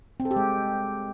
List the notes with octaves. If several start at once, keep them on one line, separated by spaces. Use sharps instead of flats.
C4
A4
G4
G#3